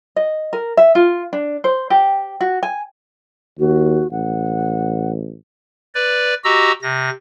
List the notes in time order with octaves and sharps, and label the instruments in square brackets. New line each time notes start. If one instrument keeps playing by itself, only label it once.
[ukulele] D#5
A#4
E5
F4
D4
C5
G4
F#4
G#5
[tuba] D#2 [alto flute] F#4
[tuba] A1 [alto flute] F#5
[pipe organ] B4 D5
F#4 G4 D#5 A#5 E6
C3 A#6